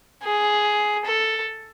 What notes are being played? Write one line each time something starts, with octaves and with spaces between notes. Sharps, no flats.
G#4
A4